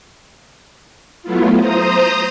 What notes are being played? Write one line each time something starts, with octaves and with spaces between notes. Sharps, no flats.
F#3 A3 B3 E4 F4
C5 A#5 D#6